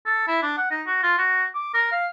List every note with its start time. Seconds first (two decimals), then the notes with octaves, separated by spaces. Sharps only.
0.06 A4
0.28 E4
0.43 D4
0.57 F#5
0.71 D#4
0.87 F#4
1.03 F4
1.18 F#4
1.55 D6
1.74 A#4
1.92 F5